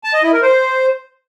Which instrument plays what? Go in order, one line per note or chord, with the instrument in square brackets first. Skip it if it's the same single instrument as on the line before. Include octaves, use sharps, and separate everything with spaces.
[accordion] A5
D#5
E4
A#4
C5